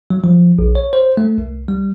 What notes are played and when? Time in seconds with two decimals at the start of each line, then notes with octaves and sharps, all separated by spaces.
0.10 F#3
0.24 F3
0.59 A#1
0.75 C#5
0.93 C5
1.17 A3
1.38 C2
1.68 G3